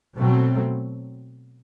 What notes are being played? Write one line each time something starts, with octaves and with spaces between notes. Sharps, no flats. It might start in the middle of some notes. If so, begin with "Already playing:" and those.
B2 F#3 A3 C4